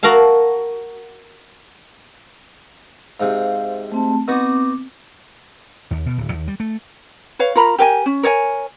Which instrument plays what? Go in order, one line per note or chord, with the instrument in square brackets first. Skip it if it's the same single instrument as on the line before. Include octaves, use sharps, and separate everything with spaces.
[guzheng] F#4 A#4 E5 F5 A5
[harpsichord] G#2 C3 [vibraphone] F5
[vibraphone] A3 C4 A5
[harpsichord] B3 D#4 F#4 [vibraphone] C4 D6
[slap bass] D#2
B2
D1
D#2
G3
A3
[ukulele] B4 C#5 F5
F4 A#4 A#5 B5
G4 A#4 G5 G#5
C#4
A#4 C#5 D5 G#5